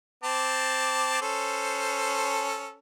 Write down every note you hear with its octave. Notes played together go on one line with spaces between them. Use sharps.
C4 A5 D6
C#4 A4 C5